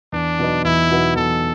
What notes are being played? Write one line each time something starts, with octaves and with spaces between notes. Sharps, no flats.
E2 D4
B2 F#3 B3 D#4
E2 E4
B2 F#3 B3 D#4
E2 A4